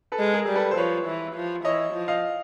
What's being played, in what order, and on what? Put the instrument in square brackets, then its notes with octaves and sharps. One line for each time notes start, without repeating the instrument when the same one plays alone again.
[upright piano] A4 B4
[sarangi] G#3
[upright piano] G#4 A#4
[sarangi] G3
[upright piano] A4 B4
C5
[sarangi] F3 [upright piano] B4 C#5
[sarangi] E3
F3
[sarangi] E3 [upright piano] C#5 D#5
[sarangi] F3
[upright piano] D#5 F5